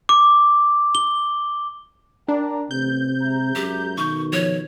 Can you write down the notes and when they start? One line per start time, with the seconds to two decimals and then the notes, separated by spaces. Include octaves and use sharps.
0.09 D6
0.95 G7
2.28 D4 A#4 G5 A#5
2.71 A1 C3 G6
3.22 G#3 E5 A#5
3.55 F#2 G4
3.98 B1 B2 D#3 C#6
4.33 F3 C#5